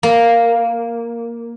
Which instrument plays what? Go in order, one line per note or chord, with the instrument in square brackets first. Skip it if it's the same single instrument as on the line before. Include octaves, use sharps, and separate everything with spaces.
[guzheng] A#3